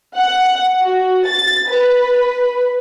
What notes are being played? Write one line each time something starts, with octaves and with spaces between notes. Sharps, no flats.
F#5
F#4
A6
B4